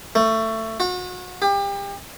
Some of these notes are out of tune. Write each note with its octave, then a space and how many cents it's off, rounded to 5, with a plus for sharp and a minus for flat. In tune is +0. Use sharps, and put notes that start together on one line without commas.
A3 +20
F#4 -35
G4 +30